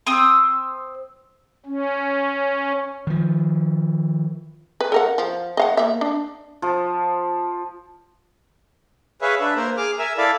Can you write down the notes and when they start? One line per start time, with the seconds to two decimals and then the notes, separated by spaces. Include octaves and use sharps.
0.07 C4 C5 D#6 E6
1.66 C#4
3.07 D#3 F3
4.81 B4
4.92 A4 A#4 F#5
5.18 F3
5.57 D#5 F5 F#5
5.77 A#3 E5
6.01 D4
6.62 F3
9.22 G#4 B4 C#5 E5 F5 B5
9.40 D4 B4 E5
9.56 A#3 A#4 C5
9.77 G#4 D6 F6
9.99 A#4 E5 G#5 E6
10.18 E4 A4 D5 F5 B5